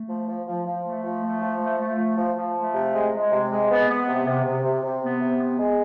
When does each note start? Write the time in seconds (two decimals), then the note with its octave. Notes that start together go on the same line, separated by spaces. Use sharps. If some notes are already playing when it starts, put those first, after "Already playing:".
Already playing: A3
0.09 F3
0.28 F3
0.48 F3
0.66 F3
0.85 A3
1.04 F3
1.23 A3
1.42 F3
1.60 A3
1.80 A3
1.99 F3
2.17 F3
2.37 F3
2.56 A3
2.75 C3
2.94 G#3
3.13 G#3
3.31 C3
3.51 G#3
3.69 B3
3.88 B3
4.08 C3
4.26 C3
4.45 C3
4.64 C3
4.83 C3
5.02 B3
5.21 C3
5.39 B3
5.59 G#3